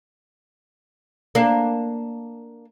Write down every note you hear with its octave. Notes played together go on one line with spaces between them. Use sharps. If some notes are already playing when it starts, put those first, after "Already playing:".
A#3 D4